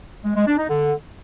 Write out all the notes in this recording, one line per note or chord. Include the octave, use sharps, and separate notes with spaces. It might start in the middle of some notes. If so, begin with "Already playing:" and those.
G#3
G#3
D4
D#4
D3